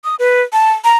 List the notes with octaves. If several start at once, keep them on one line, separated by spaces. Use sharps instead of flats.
D#6
B4
A5
A#5